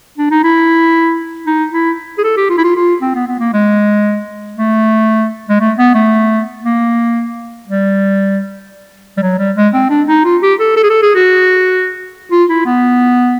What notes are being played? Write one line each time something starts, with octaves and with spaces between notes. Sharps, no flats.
D4
D#4
E4
D#4
E4
G#4
A4
G4
F4
E4
F4
F4
C4
B3
B3
A#3
G#3
A3
G#3
A3
B3
A3
A#3
G3
G3
F#3
G3
G#3
C4
D4
D#4
F4
G4
A4
A4
G#4
A4
G#4
F#4
F4
E4
B3